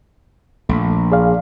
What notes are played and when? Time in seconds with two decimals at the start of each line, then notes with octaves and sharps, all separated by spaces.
0.69 A#1 A3
1.12 G#4 D5 F5